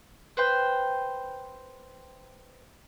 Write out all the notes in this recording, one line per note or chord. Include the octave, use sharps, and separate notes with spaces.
B4 C5 G5